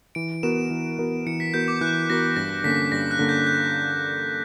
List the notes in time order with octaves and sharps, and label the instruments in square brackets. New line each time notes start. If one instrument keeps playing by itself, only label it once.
[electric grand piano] E3 [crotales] D7
[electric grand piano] B3 F#4 A#4 [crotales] E7
[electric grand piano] E3
B3 F#4 A#4
[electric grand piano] E3 [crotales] C#7
[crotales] B6
[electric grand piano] B3 F#4 A#4 [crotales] G6
[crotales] D6
[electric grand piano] E3 [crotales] F#6
[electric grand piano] B3 F#4 A#4 [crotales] A#6
[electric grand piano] G2 [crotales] A#6
[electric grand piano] D3 A#3 C#4 [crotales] B6
[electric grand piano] G2 [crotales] A#6
[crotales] F#6
[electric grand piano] D3 A#3 C#4
[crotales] G6
G6